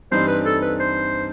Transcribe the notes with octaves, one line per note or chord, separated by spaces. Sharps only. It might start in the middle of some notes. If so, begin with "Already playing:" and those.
G2 E3 G3 C4 D#4 C5
B4
A4
B4
C5